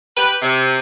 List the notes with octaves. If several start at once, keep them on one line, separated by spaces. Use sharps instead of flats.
G4 B4
C3